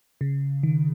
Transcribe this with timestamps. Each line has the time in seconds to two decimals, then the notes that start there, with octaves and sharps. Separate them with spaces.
0.21 C#3
0.63 D#3